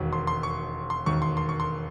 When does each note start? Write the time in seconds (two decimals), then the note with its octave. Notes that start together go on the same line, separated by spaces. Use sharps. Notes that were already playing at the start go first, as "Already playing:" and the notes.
Already playing: E1 D#2 D#3
0.13 C6
0.27 C6
0.43 C#6
0.90 C6
1.06 E1 D#2 D#3 C#6
1.22 C6
1.37 C6
1.49 C#6
1.60 C6